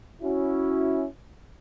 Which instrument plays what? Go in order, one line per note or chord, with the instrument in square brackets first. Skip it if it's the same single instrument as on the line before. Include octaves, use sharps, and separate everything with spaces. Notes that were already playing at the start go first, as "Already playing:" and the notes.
[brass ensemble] C#4 E4 F#4